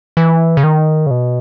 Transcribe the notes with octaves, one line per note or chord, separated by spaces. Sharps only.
E3
C#3
D#3
C#3
B2